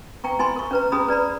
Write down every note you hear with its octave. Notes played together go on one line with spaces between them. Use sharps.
G5 A#5 C#6
E4 G#5 B5 C6
A#4 C#6
C#4 B4 A#5
C#4 G#4 A#5 B5 D#6
B4 D5 A#5 B5